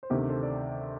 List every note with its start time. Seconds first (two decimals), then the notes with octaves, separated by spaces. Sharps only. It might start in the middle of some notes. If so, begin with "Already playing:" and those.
0.03 C5
0.10 D2 C3 D#3 G4 A#4
0.29 A4 C5
0.43 D5